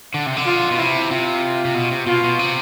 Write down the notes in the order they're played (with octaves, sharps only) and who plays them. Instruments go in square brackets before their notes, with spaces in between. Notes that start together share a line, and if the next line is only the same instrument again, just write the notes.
[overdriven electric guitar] D3
C3
D3
[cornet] F4
[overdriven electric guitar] B2
[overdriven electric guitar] C3 [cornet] E4
[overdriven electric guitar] C3 [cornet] F4
[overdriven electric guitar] C3
B2
C3
[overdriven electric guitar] B2 [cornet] F4
[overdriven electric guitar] B2
C3